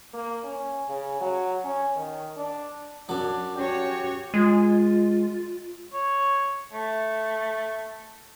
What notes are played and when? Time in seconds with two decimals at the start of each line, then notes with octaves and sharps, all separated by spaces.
0.14 A#3
0.44 C#4
0.89 C#3
1.21 F#3
1.65 C#4
1.96 D#3
2.37 D4
3.09 F#2 F#3 D4
3.56 C#4 F#4 G4 C#5
4.34 G#3 F4
5.93 C#5
6.73 A3